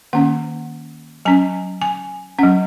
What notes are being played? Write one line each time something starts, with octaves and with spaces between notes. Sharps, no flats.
D#3 A#3 C#4 F#5
F#3 C#4 G#5
G#5
F#3 C#4 F#5